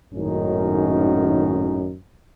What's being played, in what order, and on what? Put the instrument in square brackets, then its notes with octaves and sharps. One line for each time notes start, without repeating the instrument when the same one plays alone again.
[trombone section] G#1 F#2 A2 D#3 C#4 D#4